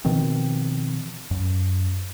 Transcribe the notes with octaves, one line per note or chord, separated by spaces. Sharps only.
B2 D#3 F3 C4
F#2